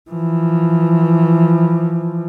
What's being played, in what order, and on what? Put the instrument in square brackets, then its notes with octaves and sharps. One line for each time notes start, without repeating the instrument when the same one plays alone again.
[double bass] E3 F3